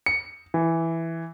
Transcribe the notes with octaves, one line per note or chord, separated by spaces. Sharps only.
C#7
E3